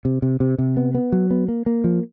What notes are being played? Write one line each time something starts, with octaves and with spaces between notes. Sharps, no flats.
C3
C3
C3
C3
B3
B3
F#3
B3
A#3
A#3
F3